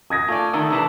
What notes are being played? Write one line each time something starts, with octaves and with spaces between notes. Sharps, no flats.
D#6 G#6 A#6
A3 F4 D5 G#5
D3 D#3 A4 E5 A5
C3 E3 D4